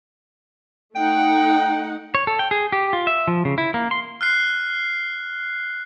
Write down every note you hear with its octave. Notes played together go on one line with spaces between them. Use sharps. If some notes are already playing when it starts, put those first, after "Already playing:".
A3 D#4 F#5 G5
C#5
A4
G5
G#4
G4
F4
E5
F3
C#3
E4
A#3
C6
F6 F#6 C7